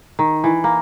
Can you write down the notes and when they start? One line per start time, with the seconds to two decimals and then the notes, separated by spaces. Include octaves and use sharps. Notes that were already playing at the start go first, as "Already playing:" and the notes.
0.19 D#3
0.44 E3
0.64 A#3